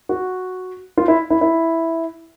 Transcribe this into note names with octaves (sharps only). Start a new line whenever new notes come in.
F#4
F4
E4
E4
E4